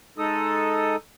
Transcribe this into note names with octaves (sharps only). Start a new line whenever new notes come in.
G#3 D#4 A4 D#6